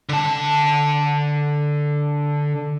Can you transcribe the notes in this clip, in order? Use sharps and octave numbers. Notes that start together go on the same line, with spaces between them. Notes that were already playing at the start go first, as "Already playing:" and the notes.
D3 A5